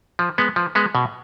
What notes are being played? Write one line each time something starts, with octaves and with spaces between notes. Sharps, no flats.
F3
G#3 B3
F3
G#3 B3
B2